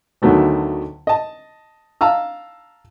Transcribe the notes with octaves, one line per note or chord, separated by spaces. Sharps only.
D2 D3 D#3 F#3 A3 B3
D#5 A5
F5 A5 A#5 E6